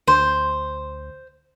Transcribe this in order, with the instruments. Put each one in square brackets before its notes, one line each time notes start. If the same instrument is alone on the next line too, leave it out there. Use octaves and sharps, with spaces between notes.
[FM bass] D2 [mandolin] C5